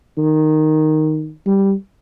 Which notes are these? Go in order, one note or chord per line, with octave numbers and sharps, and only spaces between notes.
D#3
G3